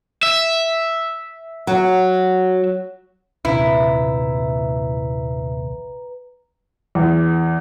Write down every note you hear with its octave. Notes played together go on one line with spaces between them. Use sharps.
E5
F#3
A#1 D#2 C3 E4 B4 A#5
E2